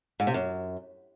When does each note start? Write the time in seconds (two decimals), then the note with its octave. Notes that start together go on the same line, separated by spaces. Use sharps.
0.20 G#2
0.27 C3
0.34 F#2